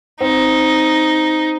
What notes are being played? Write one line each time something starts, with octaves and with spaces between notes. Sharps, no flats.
C4 D#4